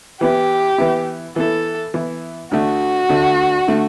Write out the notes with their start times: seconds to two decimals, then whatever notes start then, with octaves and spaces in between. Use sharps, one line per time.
0.21 E3 B3 E4 G4
0.78 E3 B3 E4
1.36 E3 B3 E4 A4
1.94 E3 B3 E4
2.51 D2 D3 A3 F#4
3.09 D2 D3 A3
3.68 D3 A3